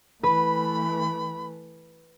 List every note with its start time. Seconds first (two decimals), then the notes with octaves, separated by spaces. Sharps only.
0.23 E3 A3 B4 B5